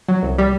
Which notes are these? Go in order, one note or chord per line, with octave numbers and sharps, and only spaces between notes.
F#3
C2
G3